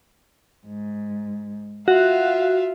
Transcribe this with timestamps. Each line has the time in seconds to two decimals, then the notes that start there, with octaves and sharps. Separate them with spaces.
0.67 G#2
1.88 F4 F#4 E5 F5